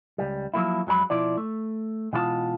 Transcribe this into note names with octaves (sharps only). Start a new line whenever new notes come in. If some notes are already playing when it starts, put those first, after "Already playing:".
C#2 G3
F3 F#3 A#3 E4
F2 F#3 G#3 A#5 B5
B2 F3 E4 D5
A3
B2 E3 G#3 F4 C5 A5